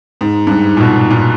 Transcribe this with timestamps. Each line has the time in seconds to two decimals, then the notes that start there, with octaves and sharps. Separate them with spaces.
0.21 G#2
0.47 G2
0.51 G#2
0.77 A#2
0.80 B2
1.10 A#2